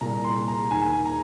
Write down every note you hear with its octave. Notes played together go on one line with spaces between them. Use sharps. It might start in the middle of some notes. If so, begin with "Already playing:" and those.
C2 A#2 A#5
C6
A#5
D#2 D#3 G#5
A#5